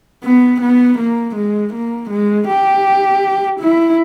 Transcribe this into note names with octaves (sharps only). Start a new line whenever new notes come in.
B3
B3
A#3
G#3
A#3
G#3
G4
E4